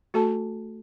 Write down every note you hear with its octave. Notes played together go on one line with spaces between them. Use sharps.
A3 F#4 A4 A5